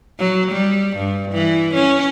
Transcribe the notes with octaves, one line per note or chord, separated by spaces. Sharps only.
F#3
G3
G2
E3
C#4